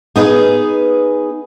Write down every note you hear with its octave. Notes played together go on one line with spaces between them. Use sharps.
B3 D#4 G#4 B4